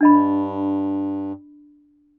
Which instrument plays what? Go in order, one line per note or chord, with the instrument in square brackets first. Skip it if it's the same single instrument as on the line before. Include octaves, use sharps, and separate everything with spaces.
[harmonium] G2 [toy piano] D4 D#5 B5